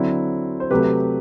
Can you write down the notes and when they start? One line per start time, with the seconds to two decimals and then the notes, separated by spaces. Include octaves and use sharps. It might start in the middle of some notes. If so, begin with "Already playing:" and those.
Already playing: D3 F#3 C4 E4
0.60 C5
0.70 C3 F#3 A3 G4 B4